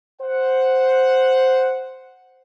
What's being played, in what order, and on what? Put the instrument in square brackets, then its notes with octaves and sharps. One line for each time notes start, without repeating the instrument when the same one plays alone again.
[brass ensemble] C5 F#5